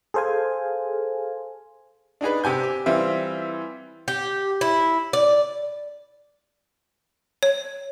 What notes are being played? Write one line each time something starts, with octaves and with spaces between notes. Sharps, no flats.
G#4 A4 C5 F5 G#5
D4 D#4 G#4 B4
C3 G4 G#5 G6
G4
E3 G3 C4 F4 E5
G4
E4
D5
C#5